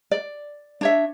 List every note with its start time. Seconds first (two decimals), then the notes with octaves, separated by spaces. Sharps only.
0.11 D5
0.81 D4 C#5 E5